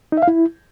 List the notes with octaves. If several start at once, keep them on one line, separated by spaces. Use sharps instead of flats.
D#4
E5
F5
E4